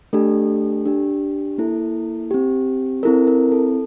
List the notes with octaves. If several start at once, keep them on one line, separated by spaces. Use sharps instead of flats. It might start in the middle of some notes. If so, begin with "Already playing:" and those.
A3 D4 G4 A4
D4 G4
A#3 E4 A4
C4 G4
C4 E4 A4 A#4
A#4
A4